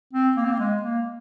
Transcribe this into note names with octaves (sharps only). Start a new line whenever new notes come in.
C4
A#3
C4
A#3
G#3
A#3